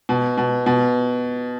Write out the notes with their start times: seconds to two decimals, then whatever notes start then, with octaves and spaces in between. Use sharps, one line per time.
0.09 B2
0.38 B2
0.66 B2